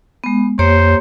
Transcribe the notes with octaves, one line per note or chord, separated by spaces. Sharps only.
G#3 B3
F2 A#3 G4 C5 C#5